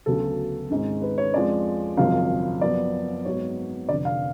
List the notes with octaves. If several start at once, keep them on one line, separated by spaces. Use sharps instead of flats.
D2 C#3 F#3 B3 A4
G#1 G#2 G#3 C#4
B4
C#5
F2 F3 G#3 C#4 D5
G#1 F#2 C#3 F3 F5
F#2 F3 B3 D5
G#2 F#3 B3 C#5
F1 F2 D3 D5
F5